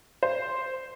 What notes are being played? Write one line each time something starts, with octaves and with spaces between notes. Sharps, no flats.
C5